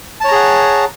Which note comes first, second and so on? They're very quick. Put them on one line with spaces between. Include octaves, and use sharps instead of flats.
A5 C#5 A#5 G#4 F#5